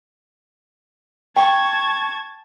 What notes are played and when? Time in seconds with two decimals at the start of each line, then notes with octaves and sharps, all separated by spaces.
1.36 G5 A5 C#6 G#6